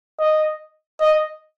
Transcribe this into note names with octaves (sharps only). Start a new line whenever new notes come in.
D#5
D#5